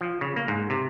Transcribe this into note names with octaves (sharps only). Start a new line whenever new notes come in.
F3
C#3
A#3
G#2
C3